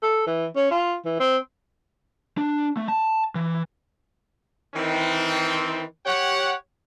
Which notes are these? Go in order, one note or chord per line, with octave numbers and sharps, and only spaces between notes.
A4
E3
C#4
F4
E3
C4
D4
A3
A5
E3
D#3 E3 C4
G4 C#5 F#5